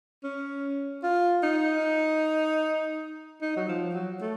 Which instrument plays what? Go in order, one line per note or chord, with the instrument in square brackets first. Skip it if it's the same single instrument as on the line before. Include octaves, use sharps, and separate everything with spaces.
[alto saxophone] C#4
F4
D#4
D#4
F#3
F3
F#3
A3